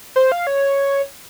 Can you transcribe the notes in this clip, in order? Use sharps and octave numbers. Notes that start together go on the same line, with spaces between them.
C5
F5
C#5